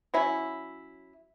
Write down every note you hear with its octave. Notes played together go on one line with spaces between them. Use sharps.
F#3 C#4 E4